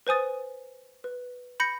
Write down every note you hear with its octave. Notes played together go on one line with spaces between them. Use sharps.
B4 C5 G#5 D#6 A6
B4
B5 G6 A#6 C#7